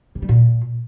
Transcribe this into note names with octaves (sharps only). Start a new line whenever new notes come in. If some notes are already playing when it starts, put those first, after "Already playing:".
C3
G3
A#2